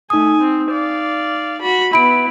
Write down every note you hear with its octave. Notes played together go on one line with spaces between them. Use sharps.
A3 D#4 G#5 D#6
C4
D5 F5
F#4 B5
B3 E4 B5 D7